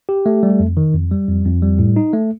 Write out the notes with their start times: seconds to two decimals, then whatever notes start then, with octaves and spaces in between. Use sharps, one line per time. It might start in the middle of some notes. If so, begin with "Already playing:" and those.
0.09 G4
0.26 A3
0.43 G3
0.60 F2
0.77 D#3
0.94 F2
1.11 G3
1.28 F2
1.45 F2
1.63 G3
1.79 A2
1.96 D#4
2.13 A3